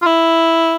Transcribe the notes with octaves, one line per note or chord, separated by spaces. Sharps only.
F4
E4